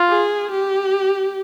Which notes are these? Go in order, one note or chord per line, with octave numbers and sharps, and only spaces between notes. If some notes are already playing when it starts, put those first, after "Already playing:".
Already playing: F4
G#4
G4